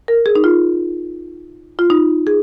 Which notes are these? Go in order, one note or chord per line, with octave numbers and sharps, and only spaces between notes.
A#4
G#4
D#4
F4
F4
D#4
G#4